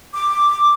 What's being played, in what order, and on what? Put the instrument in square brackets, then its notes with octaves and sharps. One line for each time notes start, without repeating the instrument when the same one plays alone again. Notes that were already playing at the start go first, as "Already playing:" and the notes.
[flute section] D6